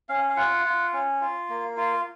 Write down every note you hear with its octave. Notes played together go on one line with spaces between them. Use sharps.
C#4 F5
F5
F4 F#5
F4
C#4
F4
A#3
F4